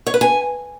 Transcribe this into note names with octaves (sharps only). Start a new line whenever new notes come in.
C#5
B4
G#5